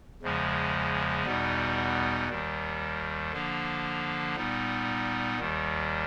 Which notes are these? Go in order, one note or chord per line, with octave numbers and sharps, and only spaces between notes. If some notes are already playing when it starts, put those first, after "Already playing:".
E2 C#3 F3 G#3
E2 B2 G3 B3 D#4
D#2 D#3 G3
D3 F3 A#3 D4
A#2 G3 B3 D#4
D#2 D#3 G3